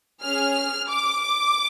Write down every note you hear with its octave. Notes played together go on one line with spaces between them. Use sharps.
C#4 G#4 F6
D6